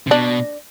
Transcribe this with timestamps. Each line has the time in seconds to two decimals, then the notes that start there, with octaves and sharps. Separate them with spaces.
0.07 C3
0.11 B2 D4